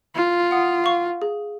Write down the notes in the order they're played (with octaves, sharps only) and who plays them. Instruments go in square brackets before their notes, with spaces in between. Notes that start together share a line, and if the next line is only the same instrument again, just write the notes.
[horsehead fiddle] F4
[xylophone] F#5 D#6
F5 C#6
G#4